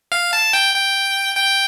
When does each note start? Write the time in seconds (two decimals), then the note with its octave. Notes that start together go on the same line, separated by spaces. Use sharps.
0.12 F5
0.33 A5
0.53 G5
0.74 G5
1.37 G5